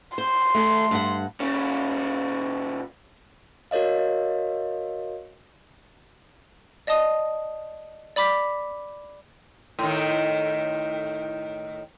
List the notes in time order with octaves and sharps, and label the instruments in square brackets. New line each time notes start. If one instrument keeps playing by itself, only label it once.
[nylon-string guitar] C5 [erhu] C6
[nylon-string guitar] A3 A4
G2 F#5
[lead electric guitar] A#2 C#4
[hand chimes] F#4 A#4 C#5 D#5 F5
[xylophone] D5 D#5 A5 D#6
D5 B5 D6 B6
[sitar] A2 D#3